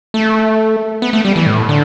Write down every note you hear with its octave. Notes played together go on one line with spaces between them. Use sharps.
A3
B3
A3
G3
E3
A2
D3